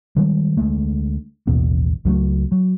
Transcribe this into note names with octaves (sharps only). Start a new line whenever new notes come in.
D#3 G3 G#3
D2 G#3 A3
A1 D#2 B2 B3
C#2 F#3 G#3 A3
F#3